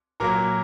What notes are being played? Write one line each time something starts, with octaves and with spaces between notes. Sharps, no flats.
A#2 F#3 A#3 A#4 A#5